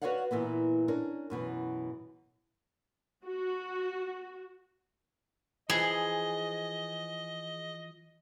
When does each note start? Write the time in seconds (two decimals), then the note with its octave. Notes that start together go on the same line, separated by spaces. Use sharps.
0.02 F#4 B4 C#5 D5 F5 F#5
0.31 A#2 E3 A#3 B3
0.88 C#4 D4 A#4
1.30 F#2 B2 E3
3.25 F#4
5.70 E3 F3 G#4 D#5